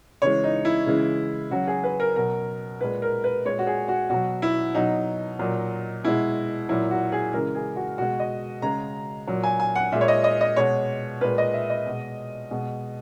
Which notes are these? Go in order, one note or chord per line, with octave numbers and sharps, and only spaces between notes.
C#3 E3 G#3 C#5
D#4
E4
C#3 E3 G#3
C#3 F#3 F#4
G#4
B4
A#4
B2 F#3 A#4
A#2 G#3 B4
A#4
B4
A#2 G#3 C#5
F#4
G#4
F#4
B2 F#3 F#4
E4
B2 F#3 D#4
A#2 F#3
B2 G#3 E4
A#2 F#3 E4
F#4
G#4
C#3 E3 G#3 A#4
G#4
F#4
B2 G#3 F#4
D#5
C#3 G#3 A#5
A#2 F#3
G#5
G#5
F#5
A#2 G#3 E5
C#5
D#5
D#5
D#5
B2 G#3 C#5
A#2 G#3 B4
D#5
E5
D#5
B2 G#3
B2 G#3